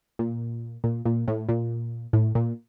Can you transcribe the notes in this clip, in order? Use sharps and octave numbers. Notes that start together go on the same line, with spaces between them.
A#2
A#2
A#2
A2
A#2
A2
A#2